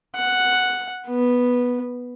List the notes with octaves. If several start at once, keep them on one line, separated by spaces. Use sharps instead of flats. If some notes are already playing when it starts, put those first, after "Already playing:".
F#5
B3